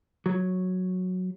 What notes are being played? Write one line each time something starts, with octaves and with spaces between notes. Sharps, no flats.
F#3